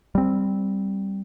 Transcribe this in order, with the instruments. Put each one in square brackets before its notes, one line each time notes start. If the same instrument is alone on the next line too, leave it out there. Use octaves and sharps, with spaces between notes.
[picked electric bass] G3 C4